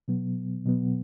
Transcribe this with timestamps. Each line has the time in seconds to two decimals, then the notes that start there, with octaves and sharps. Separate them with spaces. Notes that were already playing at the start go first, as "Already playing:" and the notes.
0.08 B2 F#3 B3
0.65 B2 F#3 B3